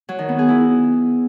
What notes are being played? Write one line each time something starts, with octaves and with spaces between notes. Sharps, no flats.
F#3
D#3
B3
G#4
E4